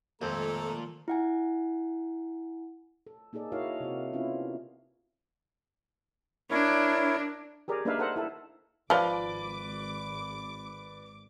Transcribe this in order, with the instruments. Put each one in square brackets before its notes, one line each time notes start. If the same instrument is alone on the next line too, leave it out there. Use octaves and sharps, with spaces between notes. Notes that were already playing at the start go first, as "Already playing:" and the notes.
[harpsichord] F2 [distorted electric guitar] A#2 [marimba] D#3 F3 G#3 [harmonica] A3 A4 A#5
[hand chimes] E4 F#5 G#5
[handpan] A4
A#3 D#4 G#4 A4 D5
E4 F#4 A#4 C#5 D#5 F5
C3 C4 F#4
B3 C#4 E4 F4
[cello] D4 [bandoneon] E4 A#4 C#5
[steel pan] G4 G#4 A#4 D5
A#3 D4 D#4 B4 E5 F5
A4 A#4 C5 F5 F#5
E4 A4
[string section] G#1 D6 [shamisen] F3 F4 [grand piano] B4 D5